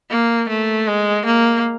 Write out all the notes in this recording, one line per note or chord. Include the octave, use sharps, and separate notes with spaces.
A#3
A3
G#3
A#3